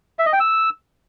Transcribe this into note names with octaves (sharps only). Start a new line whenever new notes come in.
E5
D#5
G5
E6